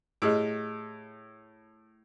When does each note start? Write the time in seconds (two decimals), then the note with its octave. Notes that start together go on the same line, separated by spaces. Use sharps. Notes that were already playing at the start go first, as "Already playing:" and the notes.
0.22 A2 G4 G#4 D#5